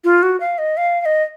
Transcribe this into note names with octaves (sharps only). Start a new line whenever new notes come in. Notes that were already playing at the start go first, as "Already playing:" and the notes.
F4
F#4
F5
D#5
F5
F5
D#5